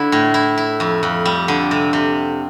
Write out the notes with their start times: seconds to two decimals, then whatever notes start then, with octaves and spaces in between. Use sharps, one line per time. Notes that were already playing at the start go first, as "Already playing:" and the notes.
Already playing: D3 E4
0.12 A2
0.34 E4
0.58 E4
0.80 F2
1.03 F2
1.25 G3
1.48 D3
1.71 C3
1.93 C3